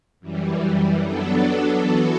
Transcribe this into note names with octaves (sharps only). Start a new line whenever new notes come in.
F#2 E3 G3
F#3 B3 D4 A4
E3 B3 F#4 A4